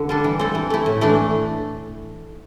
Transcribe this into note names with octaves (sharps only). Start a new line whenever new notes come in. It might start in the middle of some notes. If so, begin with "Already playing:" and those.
Already playing: D3 E4
G3 D4 A4
E3
C4 A4
E3
A3 E4
A2
E3 A3 D4